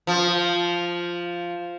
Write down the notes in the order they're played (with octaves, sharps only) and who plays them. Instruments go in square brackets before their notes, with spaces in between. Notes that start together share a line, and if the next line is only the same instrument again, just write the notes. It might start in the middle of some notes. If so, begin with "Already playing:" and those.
[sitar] F3